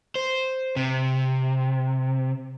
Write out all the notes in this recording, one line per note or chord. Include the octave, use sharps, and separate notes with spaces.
C5
C3